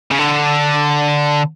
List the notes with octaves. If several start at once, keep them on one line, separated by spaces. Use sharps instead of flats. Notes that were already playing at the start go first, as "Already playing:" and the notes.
C#3
D3